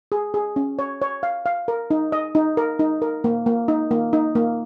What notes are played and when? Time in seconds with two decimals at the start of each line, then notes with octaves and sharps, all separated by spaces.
0.12 G#4
0.34 G#4
0.56 C#4
0.79 C#5
1.02 C#5
1.23 F5
1.46 F5
1.68 A#4
1.90 D#4
2.12 D#5
2.35 D#4
2.57 A#4
2.79 D#4
3.02 A#4
3.24 A#3
3.46 A#3
3.68 D#4
3.91 A#3
4.13 D#4
4.35 A#3